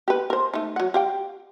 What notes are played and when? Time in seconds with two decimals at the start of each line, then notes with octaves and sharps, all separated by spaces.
0.08 G4 B4
0.30 A#4 C5
0.54 A3 D#4
0.76 F#3 F#5
0.94 G4 F5 G5